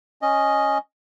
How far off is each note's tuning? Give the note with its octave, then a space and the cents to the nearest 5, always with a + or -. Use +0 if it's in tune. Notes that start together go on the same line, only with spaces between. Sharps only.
C#4 +0 D#5 +0